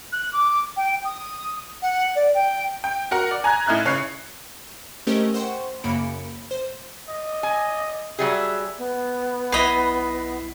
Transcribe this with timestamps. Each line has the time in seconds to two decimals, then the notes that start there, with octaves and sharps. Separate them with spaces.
0.12 F#6
0.33 D6
0.76 G5
1.04 D#6
1.82 F#5
2.15 D5
2.34 G5
2.84 G5
3.11 F#4 A#4 F#5
3.31 D5
3.44 G#5 A#5 F#6 G#6
3.66 A2 D#4 E4 F6 F#6 G#6
3.85 C#3 C#5 F#6 C7
5.07 A3 C#4 G4 A#4 C5 D#5
5.34 C5 F#5 G5 C6 C#6
5.84 F#2 C#3 A#3 B5 C#7 D7
6.51 C5
7.09 D#5
7.43 G#5
8.19 F#3 G3 G#4 E5
8.78 B3
9.52 B1 E4 B4 D#5 B6 C7